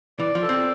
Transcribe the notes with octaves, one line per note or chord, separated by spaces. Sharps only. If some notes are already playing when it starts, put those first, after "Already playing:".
E3 D5
F3
A4
C4